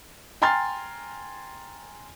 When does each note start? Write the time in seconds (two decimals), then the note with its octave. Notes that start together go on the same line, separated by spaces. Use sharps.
0.42 G5 G#5 A#5 C6 F6 A6